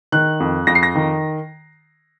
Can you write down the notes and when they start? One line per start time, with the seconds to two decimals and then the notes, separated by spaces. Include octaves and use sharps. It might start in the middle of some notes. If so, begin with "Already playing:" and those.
0.12 D#3 F#6
0.40 F2
0.67 F2 A#6
0.75 C7
0.83 A#6
0.95 D#3